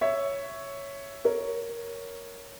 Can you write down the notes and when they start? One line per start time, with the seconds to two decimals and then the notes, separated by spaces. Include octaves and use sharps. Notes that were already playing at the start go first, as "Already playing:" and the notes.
0.01 C#5 E5
1.24 A#4 C#5